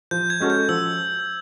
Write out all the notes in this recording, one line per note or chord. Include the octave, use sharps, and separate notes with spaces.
F3 G6
G#6
G#3 C#4 F#4 A4
G6
F3 E6